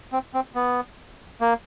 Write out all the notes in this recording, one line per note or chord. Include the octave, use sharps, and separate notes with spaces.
C4
C4
B3
A#3